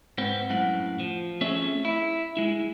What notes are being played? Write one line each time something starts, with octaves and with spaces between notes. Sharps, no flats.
G#2 B3 C4
F#2 A2 F#5
F3
A3 C4 C#4 G#4 C#5 E5
E4
G#3 E4